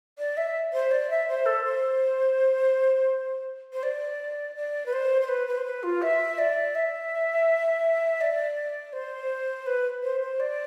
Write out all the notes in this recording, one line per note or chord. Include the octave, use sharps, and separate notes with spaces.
D5
E5
C5
D5
E5
C5
A4
C5
C5
D5
D5
B4
C5
C5
B4
B4
C5
B4
F4
E5
D5
E5
D5
C5
B4
C5
C5
D5